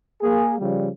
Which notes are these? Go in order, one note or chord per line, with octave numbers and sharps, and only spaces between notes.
A#3 G#4
C#3 F3 G3